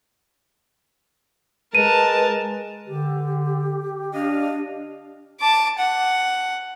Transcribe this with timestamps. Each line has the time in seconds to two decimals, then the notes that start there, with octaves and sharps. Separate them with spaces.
1.75 G#3 A#4 B4 A5 D#7
2.87 D3 G4
4.14 D4 D#5 F5
5.40 A5 D6
5.79 F#5